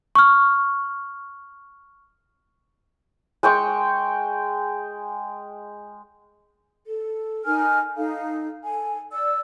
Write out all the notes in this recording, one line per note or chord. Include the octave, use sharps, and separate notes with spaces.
C#6 F6
G#3 G5 C#6
A4
D#4 A#4 G#5 F6
D#4 A4 F5
A4 G#5
D5 E6